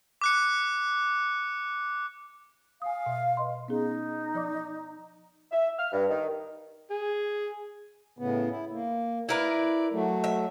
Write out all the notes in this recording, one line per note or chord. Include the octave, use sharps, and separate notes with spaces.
D6 F#6 C#7
F5 G#5 D#6
B2 E5
B4 D#5 C6
B3 C#4 D#4 G#4
F3 D5 D6
E5
F6
G2
D#3
G#4
A2 C#3 B3
E4
A#3
E4 A#4 B4 D5
F#3 A3
E5